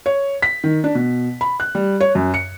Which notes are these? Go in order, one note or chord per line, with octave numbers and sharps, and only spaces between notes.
C#5
B6
D#3
D4
B2
B5
F#6
G3
C#5
F#2
C#7